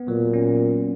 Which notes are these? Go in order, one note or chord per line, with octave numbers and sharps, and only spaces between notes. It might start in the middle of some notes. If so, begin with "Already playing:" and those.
Already playing: B3
A#2 F#3
C#4